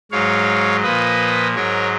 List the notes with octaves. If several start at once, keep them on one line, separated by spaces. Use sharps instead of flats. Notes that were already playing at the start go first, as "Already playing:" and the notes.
G#2 F#3 C#5 F5
A#2 F3 B4 D#5
G#2 F#3 A#4 C#5